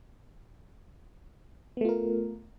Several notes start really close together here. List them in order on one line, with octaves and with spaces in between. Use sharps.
B3 A3 F4 A#4